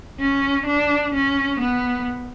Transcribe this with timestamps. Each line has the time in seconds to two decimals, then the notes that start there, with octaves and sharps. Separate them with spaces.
0.20 C#4
0.66 D4
1.14 C#4
1.60 B3